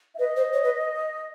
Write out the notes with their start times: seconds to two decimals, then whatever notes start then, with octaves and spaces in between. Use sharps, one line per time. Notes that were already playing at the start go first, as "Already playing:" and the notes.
0.15 E5
0.19 B4 D#5
0.36 C5
0.53 C#5
0.64 B4